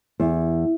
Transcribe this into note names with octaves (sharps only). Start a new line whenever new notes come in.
E2